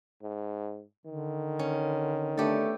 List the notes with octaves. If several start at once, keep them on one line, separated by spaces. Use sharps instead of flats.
G#2
D3 D#3
C#4
A3 B3 D4 G4 A4